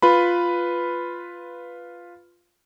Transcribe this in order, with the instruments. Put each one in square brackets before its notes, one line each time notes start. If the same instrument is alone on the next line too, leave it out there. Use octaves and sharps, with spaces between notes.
[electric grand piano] F4 B4 B5